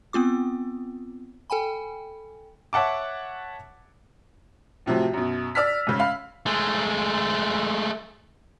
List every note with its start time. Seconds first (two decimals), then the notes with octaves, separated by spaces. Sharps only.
0.13 B3 C4 F4 D6
1.50 A4 G5 G#5 B5
2.73 C#5 E5 F#5 A5 D6
4.86 A2 C3 F3 F#3
5.14 F#2 B2
5.55 D5 E6 F6 B6
5.87 G#2 C#3
5.99 F5 B5
6.46 G#3 A3